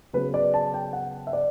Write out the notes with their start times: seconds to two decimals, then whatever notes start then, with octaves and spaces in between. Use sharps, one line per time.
0.13 C#3 F#3 B3 B4
0.34 D5
0.54 A5
0.74 G5
0.93 F#5
1.27 E5
1.33 D5